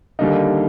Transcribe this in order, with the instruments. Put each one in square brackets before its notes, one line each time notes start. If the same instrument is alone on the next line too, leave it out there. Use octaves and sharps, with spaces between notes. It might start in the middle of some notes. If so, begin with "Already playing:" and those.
[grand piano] D#2 D3 G3 A#3 D#4